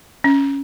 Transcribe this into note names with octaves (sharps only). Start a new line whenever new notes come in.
C#4